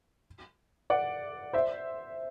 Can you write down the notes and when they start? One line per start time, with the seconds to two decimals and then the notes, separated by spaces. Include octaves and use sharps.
0.90 D5 F#5
1.53 C5 E5